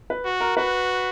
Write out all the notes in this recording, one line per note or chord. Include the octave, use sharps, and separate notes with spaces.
B4
F#4
A#4
F#4 B4